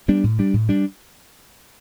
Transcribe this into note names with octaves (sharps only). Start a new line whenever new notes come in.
G3 B3 D4
A2
G3 D4
A2
G3 D4